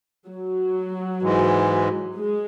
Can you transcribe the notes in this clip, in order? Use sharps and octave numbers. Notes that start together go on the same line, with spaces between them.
F#3
G#2 E3 G#3
G#3